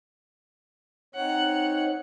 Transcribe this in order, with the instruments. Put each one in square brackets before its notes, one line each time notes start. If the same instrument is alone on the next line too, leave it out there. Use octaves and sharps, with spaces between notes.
[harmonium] C4 D#4 C#5 [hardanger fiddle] F#5